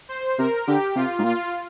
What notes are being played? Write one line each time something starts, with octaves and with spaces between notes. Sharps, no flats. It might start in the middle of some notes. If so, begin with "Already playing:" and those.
C5
C3 A#4
D3 G4
C3 F4
G#2
A#2 F4